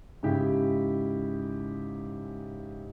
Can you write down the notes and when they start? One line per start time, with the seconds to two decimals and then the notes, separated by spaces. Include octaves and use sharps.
0.23 G#2 C#3 E4 G4